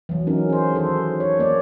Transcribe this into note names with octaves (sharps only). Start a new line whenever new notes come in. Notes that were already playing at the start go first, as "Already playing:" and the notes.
E3 F#3
C#4 D#4 A#4
G#4 C5
D#3 A4 C5
C#5
A#3 C#5 D5